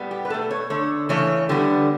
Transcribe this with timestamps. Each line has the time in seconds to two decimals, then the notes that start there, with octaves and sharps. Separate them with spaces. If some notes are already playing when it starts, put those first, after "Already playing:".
Already playing: A2 G3 B3
0.11 G4
0.25 B4
0.30 B2 A4
0.34 A3
0.51 C#5
0.70 D3 A3 C#5
1.09 C#3 E3 A3 C#5
1.49 D3 G3 B3